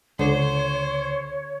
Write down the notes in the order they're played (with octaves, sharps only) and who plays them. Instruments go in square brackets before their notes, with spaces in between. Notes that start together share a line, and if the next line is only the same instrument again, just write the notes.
[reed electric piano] C#2 [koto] D3 [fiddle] C5 [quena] C#5